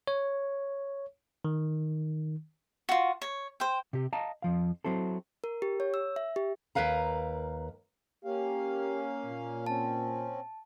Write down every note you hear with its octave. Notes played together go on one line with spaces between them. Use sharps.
C#5
D#3
F4 F#4
C#5
C5 G5
C3 G4
D#5 F5 A5 A#5
F2 F3 F5
F#3 C4 E4 A4
A#4
G4
C#5
E6
E5
G4
D#2 A#4 B4 F5 A#5
A#3 C#4 G4 F5
A#2
C4 C#4 A5